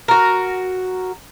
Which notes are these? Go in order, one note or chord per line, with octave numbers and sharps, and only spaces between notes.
F#4 A#4